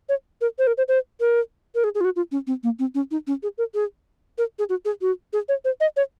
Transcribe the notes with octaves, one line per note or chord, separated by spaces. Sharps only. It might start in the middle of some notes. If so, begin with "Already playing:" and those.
C#5
A#4
C5
A#4
C5
C5
A#4
A#4
G#4
G#4
F4
F#4
F4
C#4
C4
A#3
C4
C#4
D#4
C#4
G#4
A#4
G#4
A#4
G#4
F#4
G#4
F#4
G#4
C#5
C5
D#5
C#5